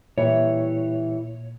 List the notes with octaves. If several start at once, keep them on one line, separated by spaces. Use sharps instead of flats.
A#2 E3 G3 C#5